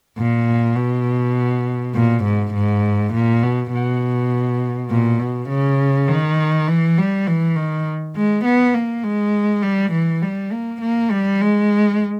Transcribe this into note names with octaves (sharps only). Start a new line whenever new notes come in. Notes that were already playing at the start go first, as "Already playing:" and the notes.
A#2
B2
A#2
G#2
G#2
A#2
B2
B2
A#2
B2
C#3
D#3
E3
G3
E3
D#3
G#3
B3
A#3
G#3
G3
E3
G3
A#3
A#3
G3
G#3